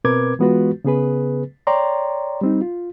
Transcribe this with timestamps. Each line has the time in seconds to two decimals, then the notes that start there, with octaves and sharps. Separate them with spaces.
0.04 B2 C4 A#4 B4 D6 G#6
0.39 E3 G#3 B3 F4 F#4 B4
0.84 C#3 B3 G#4 B4
1.67 C#5 D5 G5 A#5 C6
2.41 G3 C4 D#4
2.61 F4